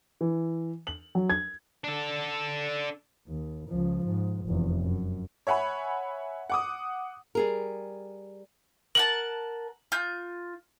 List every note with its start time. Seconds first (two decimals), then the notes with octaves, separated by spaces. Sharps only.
0.21 E3
0.87 F#7
1.15 F#3
1.30 G#6
1.84 D4 A4
3.27 D#2
3.69 C#2 F3
4.06 G#2
4.47 F1 E2
4.82 F#2
5.47 C#5 E5 F#5 G#5 B5
6.50 F#5 D6 D#6
7.35 G3 G#4 A#4
8.95 A#4 F#5 A5 F#7
9.92 F4 G6